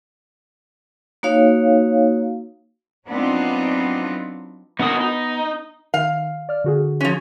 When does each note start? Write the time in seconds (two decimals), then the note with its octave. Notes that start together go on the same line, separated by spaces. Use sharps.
1.23 A#3 D#4 F#4 C#5 F5
3.07 F#3 B3 C4 D4 D#4 F4
4.79 B3 D#4 F#4 A#4 D#6
5.00 D#4
5.94 D#3 F5
6.49 D5 F6
6.64 D3 F#4 G#4
7.01 F3 C#4